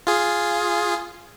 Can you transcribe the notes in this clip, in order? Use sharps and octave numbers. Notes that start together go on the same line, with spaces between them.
F4 G#4